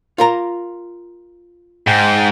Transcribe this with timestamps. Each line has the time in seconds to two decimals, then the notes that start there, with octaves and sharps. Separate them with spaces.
0.18 F4 A#4 A#5
1.87 G#2 G5